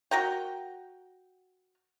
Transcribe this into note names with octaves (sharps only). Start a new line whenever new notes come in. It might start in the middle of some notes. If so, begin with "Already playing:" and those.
F#4 A#4 G5